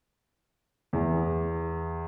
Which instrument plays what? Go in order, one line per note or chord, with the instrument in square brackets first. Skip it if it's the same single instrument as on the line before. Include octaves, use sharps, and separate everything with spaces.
[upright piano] E2